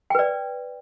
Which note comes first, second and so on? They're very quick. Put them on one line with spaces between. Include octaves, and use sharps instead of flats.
G5 B4 D5